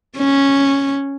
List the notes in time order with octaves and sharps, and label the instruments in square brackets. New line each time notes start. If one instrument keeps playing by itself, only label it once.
[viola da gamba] C#4